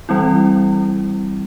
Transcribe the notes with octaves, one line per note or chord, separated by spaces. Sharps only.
E3 G3 C4 E4